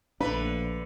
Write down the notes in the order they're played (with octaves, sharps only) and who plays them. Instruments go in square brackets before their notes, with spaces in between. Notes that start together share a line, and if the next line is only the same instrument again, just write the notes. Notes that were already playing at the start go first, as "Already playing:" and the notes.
[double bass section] A#1 A3 [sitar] D3 B4 [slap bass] D4 [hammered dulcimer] B5